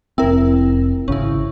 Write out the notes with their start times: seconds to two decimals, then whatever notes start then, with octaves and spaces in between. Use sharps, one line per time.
0.18 F1 C4 E4 A#4
1.08 G#1 C#3 C#4 E4